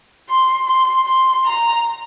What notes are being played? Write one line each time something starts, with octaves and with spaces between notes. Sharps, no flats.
C6
C6
C6
A#5